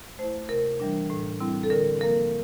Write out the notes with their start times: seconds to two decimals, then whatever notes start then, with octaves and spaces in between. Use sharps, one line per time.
0.19 A3 E4 C5
0.49 C3 A#4
0.80 E3 G3 D4
1.10 A2
1.40 G3 C4 E4
1.63 A4
1.70 D3 A#4
2.01 F3 A#3 A#4